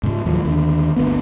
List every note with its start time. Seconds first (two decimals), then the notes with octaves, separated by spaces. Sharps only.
0.03 G#2 C#3
0.25 D#2 A2 F3 F#3
0.45 D#2 D3
0.96 G1 D2 A#3 B3